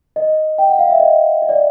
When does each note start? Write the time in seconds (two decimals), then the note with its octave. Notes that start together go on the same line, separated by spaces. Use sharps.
0.16 D#5
0.58 G5
0.69 F#5
0.79 F5
0.90 E5
1.00 D#5
1.42 D#5
1.49 D5